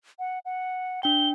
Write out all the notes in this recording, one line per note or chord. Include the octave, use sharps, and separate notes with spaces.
F#5
F#5
D4 G5 G7